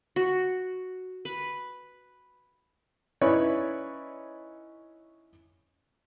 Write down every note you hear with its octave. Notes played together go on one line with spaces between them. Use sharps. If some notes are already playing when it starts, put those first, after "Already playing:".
F#4
B4
C#4 D#4 E4 B4 C#5 D5